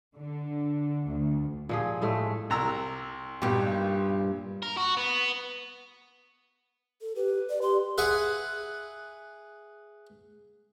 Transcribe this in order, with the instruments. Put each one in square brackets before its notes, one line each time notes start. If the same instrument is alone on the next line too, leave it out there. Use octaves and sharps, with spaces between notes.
[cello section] D3
D2
[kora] A#2 F3 G#4
A2 G#3 A3
[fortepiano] C2 A#5 E6
[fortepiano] B1 G4 [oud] G2 A#2
[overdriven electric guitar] A#4
F#4
B3
[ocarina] A4
[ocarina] G4 [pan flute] B4
[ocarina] D5
[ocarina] G4 [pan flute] C6
[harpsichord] G#4 B4 E5 F#5 G#5